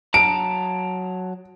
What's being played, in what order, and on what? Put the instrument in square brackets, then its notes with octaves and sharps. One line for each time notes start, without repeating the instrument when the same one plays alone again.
[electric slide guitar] F#3 A5 A#5 [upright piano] D7